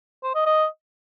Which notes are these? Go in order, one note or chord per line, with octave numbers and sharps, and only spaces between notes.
C5
D#5
D#5